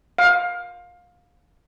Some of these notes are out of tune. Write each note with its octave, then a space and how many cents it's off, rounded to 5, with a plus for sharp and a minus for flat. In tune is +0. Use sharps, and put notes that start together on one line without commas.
F5 +20